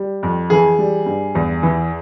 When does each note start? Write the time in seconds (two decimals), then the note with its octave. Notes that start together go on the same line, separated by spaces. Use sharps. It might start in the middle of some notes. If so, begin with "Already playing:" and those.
Already playing: G3
0.23 F2
0.50 E3 G#4
0.79 G3
1.06 G2
1.35 E2
1.63 E3